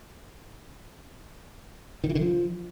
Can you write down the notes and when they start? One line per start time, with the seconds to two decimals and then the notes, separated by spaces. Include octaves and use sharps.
2.04 D#3
2.09 E3
2.15 D3
2.21 F3